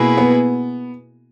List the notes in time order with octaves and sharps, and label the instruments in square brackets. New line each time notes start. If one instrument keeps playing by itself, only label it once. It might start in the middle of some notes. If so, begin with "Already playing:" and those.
Already playing: [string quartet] B2 A#3 E4 G#4 B4
[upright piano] B3